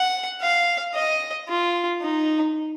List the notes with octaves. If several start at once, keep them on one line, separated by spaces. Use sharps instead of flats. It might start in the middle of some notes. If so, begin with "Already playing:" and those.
Already playing: F#5
F5
D#5
F4
D#4